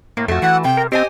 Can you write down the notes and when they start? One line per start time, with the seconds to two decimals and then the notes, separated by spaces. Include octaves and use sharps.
0.17 A2 A#3
0.28 F2 A3 F#4
0.42 E3 F#5
0.64 C3 G5
0.77 A#4
0.92 C4 G4 C5 D#5 G#5